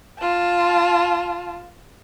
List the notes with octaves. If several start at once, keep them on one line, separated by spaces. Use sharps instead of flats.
F4 A5